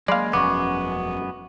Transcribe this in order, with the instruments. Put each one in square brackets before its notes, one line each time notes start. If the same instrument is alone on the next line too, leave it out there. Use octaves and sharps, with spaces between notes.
[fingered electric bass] F#3 A#3 [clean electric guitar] G#3 [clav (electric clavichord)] D5 F5 [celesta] B5 C6 C7
[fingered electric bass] E1 F3 C#4 [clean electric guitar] F#2 G#3 B3 [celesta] C#6 D6